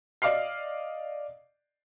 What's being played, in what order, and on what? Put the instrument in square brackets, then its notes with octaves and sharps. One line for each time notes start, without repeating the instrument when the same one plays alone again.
[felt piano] D5 D#5 F5 D6 F6 C7